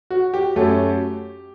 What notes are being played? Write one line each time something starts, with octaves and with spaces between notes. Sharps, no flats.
F#4
G4
F#2 F#3 A3